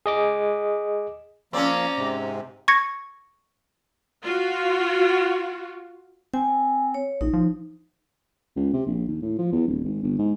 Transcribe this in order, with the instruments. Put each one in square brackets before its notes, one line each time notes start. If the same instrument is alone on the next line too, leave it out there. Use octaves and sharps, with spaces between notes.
[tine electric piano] G#4 D#5 D6
[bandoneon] F3 A#3 [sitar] C4 C#4 [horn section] D5 A#5
[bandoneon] G#2 C3
[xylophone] C#6 G#6 A#6 C#7
[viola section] F4 F#4
[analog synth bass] C4 [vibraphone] G#5
[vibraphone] C#5
[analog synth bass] A#1 [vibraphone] D#4
[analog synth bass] F3
[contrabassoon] C#2
C3
A#1
D#2
A2
F3
E2
D1
G#1
G1
G#2